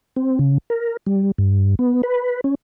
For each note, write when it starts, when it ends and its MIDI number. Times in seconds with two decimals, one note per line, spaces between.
0.17 0.39 60
0.39 0.58 49
0.70 0.97 70
1.06 1.31 55
1.38 1.75 43
1.79 2.02 59
2.03 2.41 71
2.44 2.55 61